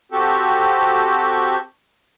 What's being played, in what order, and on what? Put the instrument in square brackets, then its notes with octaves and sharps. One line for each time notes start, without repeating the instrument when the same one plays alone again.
[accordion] C4 F#4 G4 A4